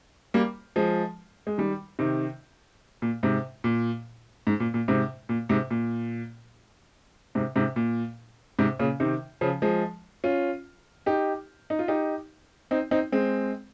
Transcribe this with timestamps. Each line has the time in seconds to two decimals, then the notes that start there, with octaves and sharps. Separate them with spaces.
0.34 G3 A#3
0.76 F3 G#3
1.47 G#3
1.58 D#3 G3
1.99 C3 D#3
3.02 A#2
3.23 G#2 C3
3.64 A#2
4.47 G#2
4.60 A#2
4.74 A#2
4.88 G#2 C3
5.29 A#2
5.49 G#2 C3
5.71 A#2
7.35 G#2 C3
7.56 G#2 C3
7.76 A#2
8.59 G#2 C3
8.79 A#2 C#3
9.00 C3 D#3
9.41 C#3 F3
9.62 F3 G#3
10.24 C#4 F4
11.06 D#4 G4
11.70 D#4
11.79 F4
11.88 D#4 G4
12.71 C4 D#4
12.91 C4 D#4
13.12 G#3 C4